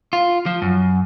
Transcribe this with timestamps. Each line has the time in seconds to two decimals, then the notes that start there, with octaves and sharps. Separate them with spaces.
0.13 F4
0.46 F3
0.62 F#2